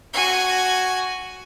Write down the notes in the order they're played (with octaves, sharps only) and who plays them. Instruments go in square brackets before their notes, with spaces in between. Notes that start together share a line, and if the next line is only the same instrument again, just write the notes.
[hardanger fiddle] F#4 G#5